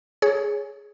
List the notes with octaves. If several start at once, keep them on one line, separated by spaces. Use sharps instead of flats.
G#4 C#5